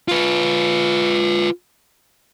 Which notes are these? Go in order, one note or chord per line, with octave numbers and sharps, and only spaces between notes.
F4 B4